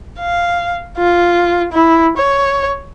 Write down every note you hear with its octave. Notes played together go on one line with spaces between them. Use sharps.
F5
F4
E4
C#5